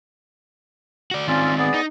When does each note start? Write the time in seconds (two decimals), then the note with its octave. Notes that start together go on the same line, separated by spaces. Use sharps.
1.11 F#4 D5
1.28 D#3 C4 C#4 F4 D5
1.57 B3 G#4 D5
1.74 D#4